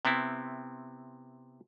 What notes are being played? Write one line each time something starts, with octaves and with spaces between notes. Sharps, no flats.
C3 B3 C4 E4